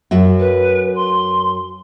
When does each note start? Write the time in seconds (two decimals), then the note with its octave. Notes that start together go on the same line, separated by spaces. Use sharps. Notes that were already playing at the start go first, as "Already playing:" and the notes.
0.11 F#2 F#4 E5
0.39 B4
0.95 C6